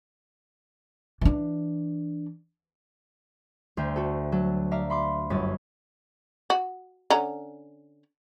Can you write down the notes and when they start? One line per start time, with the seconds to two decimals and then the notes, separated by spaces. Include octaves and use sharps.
1.21 E3 D4
3.77 D2 C5 E5 G5
3.96 F#4 A4
4.32 F#3 A4 F#6
4.71 D5 E5 F5 A#5
4.90 B5 C6 D6
5.30 G1 F#2 C#4 A6 B6
6.50 F#4
7.10 D3 C#4 A#5